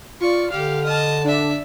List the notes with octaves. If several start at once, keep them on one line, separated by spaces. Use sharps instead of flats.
F4 D5 C#6
D3 G4 F5 F6
D#5 A5
D4 D5 E5